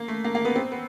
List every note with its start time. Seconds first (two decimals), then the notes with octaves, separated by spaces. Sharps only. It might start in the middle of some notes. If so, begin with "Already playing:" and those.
Already playing: A#3
0.08 A3
0.25 A#3
0.35 A#3
0.45 B3
0.56 C4
0.72 B3